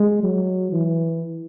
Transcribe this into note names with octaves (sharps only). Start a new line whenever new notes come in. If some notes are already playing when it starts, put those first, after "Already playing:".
Already playing: G#3
F#3
E3